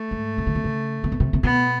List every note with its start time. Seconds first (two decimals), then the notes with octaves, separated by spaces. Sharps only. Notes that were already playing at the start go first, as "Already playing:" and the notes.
Already playing: A3
0.11 G#2
0.38 C3
0.47 C#3
0.55 C3
0.64 C#3
1.04 C3
1.12 B2
1.20 C3
1.33 C3
1.43 B2 B3